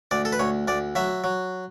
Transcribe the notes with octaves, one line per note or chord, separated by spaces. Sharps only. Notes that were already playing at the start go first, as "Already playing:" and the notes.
D2 D5
A4
B4
D2 C#5
D2 D5
F#3 E5
F#3